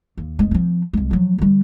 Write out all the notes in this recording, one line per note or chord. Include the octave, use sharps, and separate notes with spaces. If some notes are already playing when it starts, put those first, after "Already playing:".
D#2
F1 G#3
F3 C4
C2 G#3
F3 F#3
D3 G3